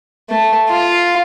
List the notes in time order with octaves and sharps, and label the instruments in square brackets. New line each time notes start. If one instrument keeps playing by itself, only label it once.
[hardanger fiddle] A3
F4